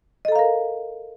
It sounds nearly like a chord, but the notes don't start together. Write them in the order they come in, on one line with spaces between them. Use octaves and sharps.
D#5 A4 A#5 F5 A#4